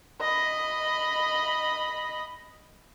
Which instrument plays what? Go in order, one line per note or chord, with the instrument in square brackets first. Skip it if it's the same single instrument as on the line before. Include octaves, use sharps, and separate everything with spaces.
[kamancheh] D#5 B5